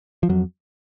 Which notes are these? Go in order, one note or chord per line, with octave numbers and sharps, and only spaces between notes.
F3
F2 F#3